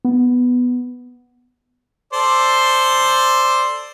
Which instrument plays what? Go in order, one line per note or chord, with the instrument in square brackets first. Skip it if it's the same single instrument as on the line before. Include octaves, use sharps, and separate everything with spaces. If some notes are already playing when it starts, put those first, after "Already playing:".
[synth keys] B3
[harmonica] A4 C5 D5